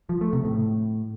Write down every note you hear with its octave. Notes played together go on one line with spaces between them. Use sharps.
F3
A3
C3
A2